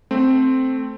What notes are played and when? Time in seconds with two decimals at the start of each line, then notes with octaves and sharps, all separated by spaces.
0.11 A3 C4